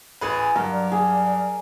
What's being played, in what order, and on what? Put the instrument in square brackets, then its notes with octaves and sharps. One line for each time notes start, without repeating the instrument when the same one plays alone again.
[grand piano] A1 G#4 B4
[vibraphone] G#5
[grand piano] G2 [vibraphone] F#3 [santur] A#4
[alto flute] D5
[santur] G#4